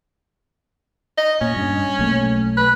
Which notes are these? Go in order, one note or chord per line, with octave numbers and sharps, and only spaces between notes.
D#5
A#2 C#4
G2
B1 A3 A#3
B4